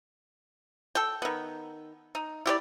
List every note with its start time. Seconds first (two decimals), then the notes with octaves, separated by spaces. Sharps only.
0.95 A4 G5
1.22 D#3 B3
2.15 D#4
2.46 E4 G4 B4 D5